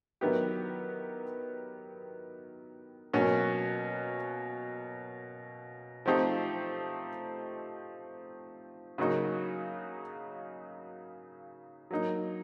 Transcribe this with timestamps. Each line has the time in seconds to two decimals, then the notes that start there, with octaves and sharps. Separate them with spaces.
0.21 D#3 F#3 B3 E4 G4
3.13 B2 F#3 A#3 C#4 F#4
6.06 F3 A3 C4 D#4 G4
8.98 C#3 F#3 A#3 D#4 F#4
11.91 F#3 A#3 D#4